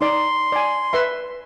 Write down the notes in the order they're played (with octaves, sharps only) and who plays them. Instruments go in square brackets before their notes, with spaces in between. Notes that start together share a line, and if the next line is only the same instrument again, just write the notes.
[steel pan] D#4 D5 [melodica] C6
[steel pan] D5 G#5
B4 E5 C6